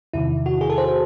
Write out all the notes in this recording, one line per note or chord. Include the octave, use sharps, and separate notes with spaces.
E2 C3 D#3 E4
F#4
G#4
A4
C5